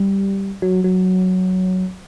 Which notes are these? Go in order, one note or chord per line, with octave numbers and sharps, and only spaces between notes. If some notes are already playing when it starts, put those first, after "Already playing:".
Already playing: G3
F#3
F#3